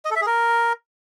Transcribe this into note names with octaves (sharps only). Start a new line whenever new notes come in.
D#5
A4
E5
G#4
A#4